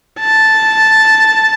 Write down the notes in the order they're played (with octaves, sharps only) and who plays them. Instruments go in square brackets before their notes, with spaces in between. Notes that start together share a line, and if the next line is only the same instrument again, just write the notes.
[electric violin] A5